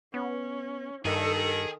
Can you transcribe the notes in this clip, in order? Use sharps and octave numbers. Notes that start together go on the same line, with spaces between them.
B3 C#4
G2 D#3 G#4 A4